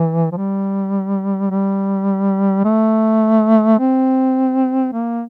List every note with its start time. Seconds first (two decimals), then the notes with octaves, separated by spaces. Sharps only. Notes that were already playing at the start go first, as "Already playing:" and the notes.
Already playing: E3
0.32 F3
0.37 G3
1.51 G3
2.65 A3
3.79 C4
4.93 A#3